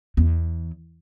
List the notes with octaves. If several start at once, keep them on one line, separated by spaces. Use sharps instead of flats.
E2